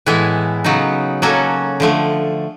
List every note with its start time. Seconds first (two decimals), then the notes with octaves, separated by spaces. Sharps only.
0.06 A2 E3 G#3 B3 E4
0.64 C#3 F#3 B3 D#4
1.22 F#3 A#3 C#4 F#4 A4
1.80 D3 F3 A3